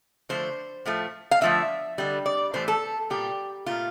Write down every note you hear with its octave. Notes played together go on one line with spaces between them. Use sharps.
D3 F3 A3 C5
A2 F3 A3
F5
D3 F3 A3 E5
D3 G3
D5
A2 E3 A3 C5
A4
A#2 G3 G4
A#2 A3 F4